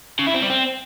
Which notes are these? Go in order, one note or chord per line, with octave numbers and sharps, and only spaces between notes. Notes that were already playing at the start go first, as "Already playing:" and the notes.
C#3
E4
C4
G3
C4